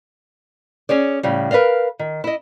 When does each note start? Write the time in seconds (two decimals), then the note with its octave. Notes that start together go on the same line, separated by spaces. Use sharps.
0.89 C#4 G#4 C#5 D5
1.23 A2 C#3 G3
1.51 A#4 B4 D5 D#5 F5
1.99 D#3
2.24 E4 D#5